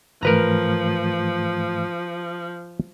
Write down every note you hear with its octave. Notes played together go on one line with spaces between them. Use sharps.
G#2 E3 F3 A3 A#4 B4 A#5